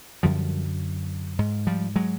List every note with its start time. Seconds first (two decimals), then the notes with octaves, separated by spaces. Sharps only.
0.23 F#2 D3 F3 G3
1.39 G#2
1.67 F3 G3
1.96 F#3 G#3